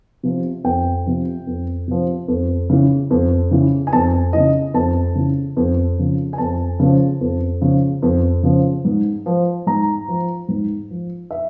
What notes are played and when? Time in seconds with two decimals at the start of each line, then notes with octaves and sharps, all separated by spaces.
0.23 C3 F3
0.64 F2 G5
1.06 C3 F3
1.47 F2
1.88 C3 F3
2.28 F2
2.70 C#3 E3
3.10 F2
3.51 C#3 E3
3.87 G#5
3.93 F2 A5
4.33 C#3 E3 D#5
4.74 F2 A5
5.15 C#3 E3
5.57 F2
5.98 C#3 F3
6.33 G#5
6.38 F2 A5
6.80 C#3 F3
7.21 F2
7.61 C#3 F3
8.02 F2
8.43 C#3 F3
8.85 G#2
9.26 F3
9.67 G#2 A#5
10.08 F3
10.48 G#2
10.90 F3
11.31 E5